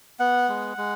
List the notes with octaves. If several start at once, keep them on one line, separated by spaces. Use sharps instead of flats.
B3 F#5
G#3
G#3